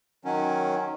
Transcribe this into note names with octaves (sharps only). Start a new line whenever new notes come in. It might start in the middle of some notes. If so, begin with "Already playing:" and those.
D#3 F#3 C#4